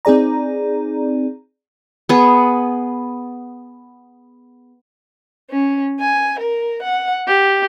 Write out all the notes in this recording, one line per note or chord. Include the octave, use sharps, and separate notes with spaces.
C4 D#4 G#4 D5 A#5
B3 G#4
C#4
G#5
A#4
F#5
G4